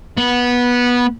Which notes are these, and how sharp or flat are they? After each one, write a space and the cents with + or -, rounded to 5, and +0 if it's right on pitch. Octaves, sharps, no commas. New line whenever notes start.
B3 -15